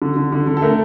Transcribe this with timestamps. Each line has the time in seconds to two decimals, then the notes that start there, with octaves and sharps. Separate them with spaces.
0.02 D3
0.17 D3
0.32 D3
0.47 D3
0.57 A4
0.62 A3 A#4